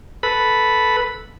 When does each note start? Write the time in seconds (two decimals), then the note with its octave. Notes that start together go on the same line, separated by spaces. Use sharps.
0.23 A4 B4 B5